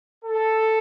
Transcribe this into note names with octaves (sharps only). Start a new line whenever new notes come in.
A4